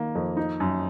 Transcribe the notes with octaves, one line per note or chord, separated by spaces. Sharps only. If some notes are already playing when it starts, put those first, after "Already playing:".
Already playing: D#3 A#3
F2
D#4
F#2